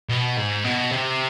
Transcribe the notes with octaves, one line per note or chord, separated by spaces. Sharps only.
B2
G#2
B2
C3